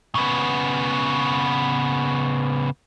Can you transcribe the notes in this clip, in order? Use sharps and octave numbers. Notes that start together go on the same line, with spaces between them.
C#3 B3